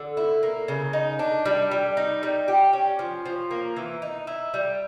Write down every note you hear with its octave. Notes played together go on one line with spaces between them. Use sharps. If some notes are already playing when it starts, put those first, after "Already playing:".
Already playing: D3
E4
A#3
C#3
D#4
D4
G3
G3
D#4
G3
G4
C#4
F3
F3
A#3
E3
D#4
E4
G3